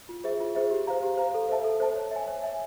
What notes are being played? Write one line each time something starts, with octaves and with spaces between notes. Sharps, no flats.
F4
G#4 C5 E5
F4
G#4 C5 E5
G4
C5 F5 A#5
G4
C5 F5 A#5
A4
C5 E5 A5
A4
C5 E5 A5
C#5
E5 G#5
C#5
E5 G#5